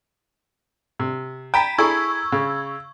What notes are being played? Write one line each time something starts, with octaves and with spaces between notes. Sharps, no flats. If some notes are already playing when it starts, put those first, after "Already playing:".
C3
G5 A#5 B5 B6
E4 G#4 A4 C#6 E6 G#6
C#3